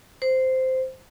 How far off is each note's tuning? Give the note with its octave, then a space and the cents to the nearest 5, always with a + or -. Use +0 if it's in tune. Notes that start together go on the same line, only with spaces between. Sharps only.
C5 -10